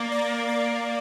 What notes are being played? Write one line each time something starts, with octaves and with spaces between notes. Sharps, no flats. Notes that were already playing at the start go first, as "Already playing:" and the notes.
Already playing: A#3 D5
D5
D5